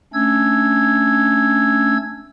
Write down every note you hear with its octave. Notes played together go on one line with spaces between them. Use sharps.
A3 C#4 D4 E6 G#6